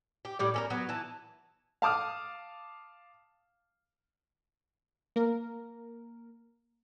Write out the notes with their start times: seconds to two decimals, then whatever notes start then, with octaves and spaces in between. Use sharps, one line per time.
0.25 G4
0.39 A2 G3 D5
0.54 C#4 A4 A#4
0.70 F#3 B3
0.89 E3 A5
1.82 F5 A5 D6 D#6 F6
5.16 A#3 A#4